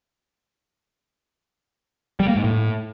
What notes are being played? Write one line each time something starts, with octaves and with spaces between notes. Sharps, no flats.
G3
A#3
G#2
A2